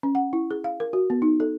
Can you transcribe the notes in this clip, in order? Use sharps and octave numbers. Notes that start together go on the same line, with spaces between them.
C#4
F#5
E4
G#4
F5
A#4
F#4
B3
D#4
A4